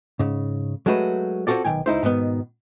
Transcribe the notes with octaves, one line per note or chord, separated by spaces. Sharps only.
G#2 C#3
F#3 G#3 A3 F#4 B4
C4 F4 F#4 A4 D5
B1 F2 D#3 G5 G#5
C#2 D#4 E4 C5
G#2 B2 D#3 B3